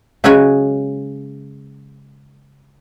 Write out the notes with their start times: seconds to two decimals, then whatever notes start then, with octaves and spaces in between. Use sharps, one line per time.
0.24 C#3 F#3 G#3 C#4 F#4 G#5